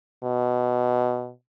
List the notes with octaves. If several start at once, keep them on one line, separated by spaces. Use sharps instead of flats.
B2